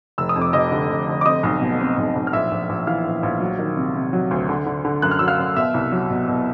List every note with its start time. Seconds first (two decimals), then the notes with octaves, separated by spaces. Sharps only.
0.18 F1 E6
0.29 D#6
0.36 F2
0.41 D6
0.53 F1 D#5 D#6
0.72 D3
0.90 F1
1.08 D3
1.21 D6
1.25 C4 D#5 D#6
1.43 B1
1.62 B2
1.80 C4
1.97 B1
2.16 B1
2.27 F6
2.33 A#1 E5 E6
2.51 A#1
2.69 A#1
2.87 E3 F5 F6
3.05 A#1
3.23 A#1
3.41 F#3
3.59 D#3
3.77 C3
3.95 C3
4.13 F#3
4.31 D2
4.49 D3
4.66 D3
4.85 D3
5.02 F#2 F#6
5.11 F6
5.19 F#3 E6
5.28 F5 F6
5.38 F#2
5.56 B2 E5 E6
5.74 C2
5.92 F#3
6.10 B2
6.28 B2